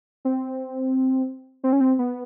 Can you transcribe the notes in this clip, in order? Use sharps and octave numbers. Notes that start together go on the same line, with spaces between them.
C4
C4
C#4
C4
B3